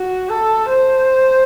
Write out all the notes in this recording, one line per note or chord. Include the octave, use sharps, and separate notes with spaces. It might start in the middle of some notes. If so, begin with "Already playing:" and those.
Already playing: F#4
A4
C5